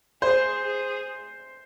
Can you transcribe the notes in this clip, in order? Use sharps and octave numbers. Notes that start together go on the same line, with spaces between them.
G#4 C5
G#4